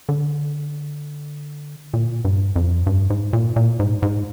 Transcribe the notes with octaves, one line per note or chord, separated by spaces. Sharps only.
D3
A#2
G2
F2
G2
G#2
A#2
A#2
G#2
G#2